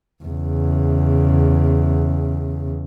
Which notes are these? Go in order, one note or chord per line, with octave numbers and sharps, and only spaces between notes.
E2 C#3